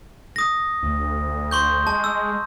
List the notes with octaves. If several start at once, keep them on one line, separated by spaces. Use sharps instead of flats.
D#6 A#6
D2
C6 C#6 G6
G#3 A5
E6